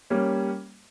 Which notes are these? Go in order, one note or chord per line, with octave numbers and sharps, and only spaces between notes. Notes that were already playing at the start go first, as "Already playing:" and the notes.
G3 A#3 C#4